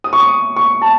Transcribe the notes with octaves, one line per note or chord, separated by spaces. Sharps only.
D#6
C#6
D#6
C#6
A5